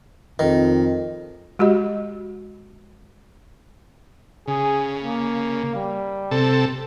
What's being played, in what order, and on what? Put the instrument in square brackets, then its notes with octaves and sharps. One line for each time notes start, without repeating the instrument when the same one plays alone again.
[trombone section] F2 [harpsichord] D#3
[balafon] G#3 F#4 G4 D#5
[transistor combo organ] C#3 [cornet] G#4
[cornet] A#3
G3
[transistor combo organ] C3 A4